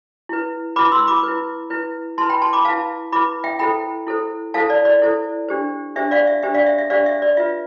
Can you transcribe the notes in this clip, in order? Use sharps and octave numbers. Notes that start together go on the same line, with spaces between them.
E4 B4
E4 B4 B5 D6
C6 E6
B5 D6
E4 B4
E4 B4
E4 B4 A5 C6
G5 B5
A5 C6
B5 D6
E4 B4 F5 A5
E4 B4 B5 D6
E5 G5
E4 A4 C5 G5 B5
E4 A4 C5
E4 A4 C5 F5 A5
D5
D5
E4 A4 C5
D4 G4 C5
D4 G4 C5 E5
D5 F5
E5
D4 G4 C5 E5
D5 F5
E5
E5
D4 G4 C5 D5 F5
E5
D5
F4 B4 E5